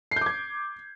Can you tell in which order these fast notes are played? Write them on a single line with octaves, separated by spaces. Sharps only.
C7 G6 D6 G#6